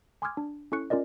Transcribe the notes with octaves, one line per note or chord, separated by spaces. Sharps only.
G#5 C6 D6 D#6 F6 G#6
D4
C#4 E4 A4 C#6 F#6 C#7
C#4 F4 A#4 D5 D#5